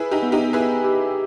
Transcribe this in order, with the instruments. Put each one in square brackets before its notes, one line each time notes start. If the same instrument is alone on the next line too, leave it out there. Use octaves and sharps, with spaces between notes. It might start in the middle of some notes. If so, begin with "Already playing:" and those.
Already playing: [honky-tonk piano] E4 G#4 [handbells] B4
[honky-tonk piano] D#4 G4
[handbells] B3
[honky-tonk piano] D#4 G4
[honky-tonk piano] E4 G#4 [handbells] B4
[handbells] G4